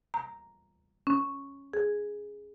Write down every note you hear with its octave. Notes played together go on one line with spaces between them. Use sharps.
A#5
C#4
G#4